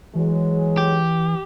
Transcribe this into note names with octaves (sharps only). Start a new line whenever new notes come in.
E3 F#3 G#3
G4